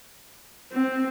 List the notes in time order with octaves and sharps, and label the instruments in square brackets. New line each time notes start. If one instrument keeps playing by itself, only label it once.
[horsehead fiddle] C4